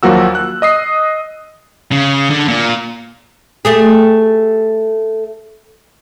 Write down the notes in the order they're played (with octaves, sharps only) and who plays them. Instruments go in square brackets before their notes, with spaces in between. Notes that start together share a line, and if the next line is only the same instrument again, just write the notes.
[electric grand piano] D#2 F3 F#3 A#3 F#4 E6
F#6
D#5 D#6 C7
[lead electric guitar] C#3
D3
A#2
[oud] A3 G4 G#4